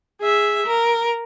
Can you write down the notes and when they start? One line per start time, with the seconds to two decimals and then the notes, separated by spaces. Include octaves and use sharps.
0.21 G#4 E5
0.66 A#4